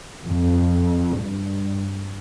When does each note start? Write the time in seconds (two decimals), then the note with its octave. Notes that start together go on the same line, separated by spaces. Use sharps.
0.25 F2
1.19 G2